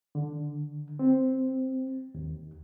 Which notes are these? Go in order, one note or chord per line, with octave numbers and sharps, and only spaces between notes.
D3
C4
D#2